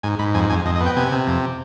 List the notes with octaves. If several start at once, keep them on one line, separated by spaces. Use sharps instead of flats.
G#2 G#5
G#2 B5
F2 G#5
F2 G#5
F2 D#5
D#5
B3
G5
C3 G#5
C3
F2